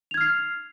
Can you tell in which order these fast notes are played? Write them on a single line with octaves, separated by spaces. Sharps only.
F7 G#6 F6 C7